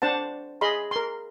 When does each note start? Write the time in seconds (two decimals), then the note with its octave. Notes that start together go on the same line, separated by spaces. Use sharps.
0.02 D4 C5 F#5 A5
0.61 G#4 D#5 B5 C6
0.91 A#4 C6